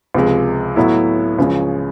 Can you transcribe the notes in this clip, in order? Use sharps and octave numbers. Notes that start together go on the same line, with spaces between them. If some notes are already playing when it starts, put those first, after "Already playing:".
C#2 C3 F3 G#3
A2 F#3 B3 E4
C#2 C#3 F3 G#3